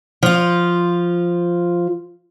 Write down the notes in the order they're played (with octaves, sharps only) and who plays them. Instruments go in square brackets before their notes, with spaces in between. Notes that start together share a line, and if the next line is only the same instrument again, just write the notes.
[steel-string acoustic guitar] F3 F4